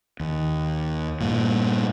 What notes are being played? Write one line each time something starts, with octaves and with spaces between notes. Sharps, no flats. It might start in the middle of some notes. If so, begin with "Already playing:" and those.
D#2
G2 A#2